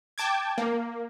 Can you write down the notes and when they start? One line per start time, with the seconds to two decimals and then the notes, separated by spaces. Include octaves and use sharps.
0.18 G5 A5 D6 G#6
0.58 A#3